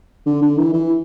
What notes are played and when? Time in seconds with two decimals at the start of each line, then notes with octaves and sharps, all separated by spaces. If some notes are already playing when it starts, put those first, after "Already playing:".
0.26 D3
0.42 D3
0.57 E3
0.73 E3